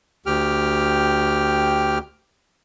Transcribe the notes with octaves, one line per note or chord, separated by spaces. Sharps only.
D2 G4 G5 F6